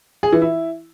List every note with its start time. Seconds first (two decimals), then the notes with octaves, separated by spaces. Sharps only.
0.23 G#4
0.32 E3
0.42 E4